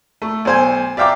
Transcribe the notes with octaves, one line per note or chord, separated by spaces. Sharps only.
A3
B1 C5 G#5
D5 E5 F5 G5 A#5 D6